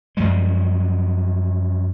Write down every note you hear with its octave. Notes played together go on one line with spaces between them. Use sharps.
F#2 F3 G3 G#3